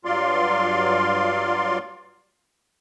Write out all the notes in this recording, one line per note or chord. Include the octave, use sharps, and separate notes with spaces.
G2 F#3 F4 D5 F5 C6